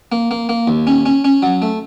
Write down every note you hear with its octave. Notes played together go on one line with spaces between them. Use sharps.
A#3
A#3
A#3
D#2
C#4
C#4
C#4
F#3
A3